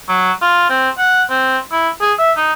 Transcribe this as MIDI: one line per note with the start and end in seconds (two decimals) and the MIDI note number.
0.09 0.32 54
0.42 0.69 65
0.70 0.90 60
0.98 1.22 78
1.30 1.58 60
1.72 1.89 64
2.01 2.13 68
2.19 2.32 76
2.37 2.52 63